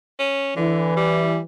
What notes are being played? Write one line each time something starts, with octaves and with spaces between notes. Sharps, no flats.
C#4
D3 E3
G3